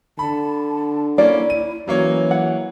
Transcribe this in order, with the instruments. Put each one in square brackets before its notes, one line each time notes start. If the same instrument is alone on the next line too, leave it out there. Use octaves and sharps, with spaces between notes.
[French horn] D3 [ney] A5 [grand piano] B5
[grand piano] A#3 C#4 [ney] E4 [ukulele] D5
[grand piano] D#7
[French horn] E3 [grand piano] F#3 A#3 C#5 [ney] C#4
[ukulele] F#5